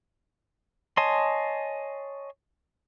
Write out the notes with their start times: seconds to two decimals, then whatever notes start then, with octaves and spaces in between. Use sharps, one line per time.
0.97 C#5 D#5 G#5 A5 C6